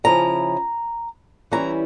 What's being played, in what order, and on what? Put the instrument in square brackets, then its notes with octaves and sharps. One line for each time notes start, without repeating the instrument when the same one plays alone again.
[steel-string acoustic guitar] C#3 F3 C#4 E4 A#5
E3 G3 C#4 E4 A#5